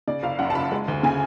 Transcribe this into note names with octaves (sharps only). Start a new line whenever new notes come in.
C#3 D5
F#1 F5
F#2 F#5
A5
F#1 B5
G#3
D2
C#3 G#5